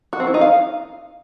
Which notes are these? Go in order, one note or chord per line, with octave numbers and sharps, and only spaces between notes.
F#4
C4
E4
D#4
F5